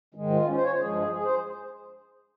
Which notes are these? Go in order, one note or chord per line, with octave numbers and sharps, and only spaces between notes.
G#2 D#3 G#3
F4
C#4
C5
C#5
C5
G2 F3 G#3 G#4
G#4
C5